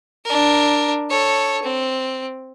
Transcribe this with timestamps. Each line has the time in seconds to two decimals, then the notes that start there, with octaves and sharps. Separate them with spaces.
0.25 D4 A#4
1.10 A4 C#5
1.63 C4